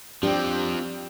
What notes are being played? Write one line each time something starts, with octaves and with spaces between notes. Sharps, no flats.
F3 C4 D4 G4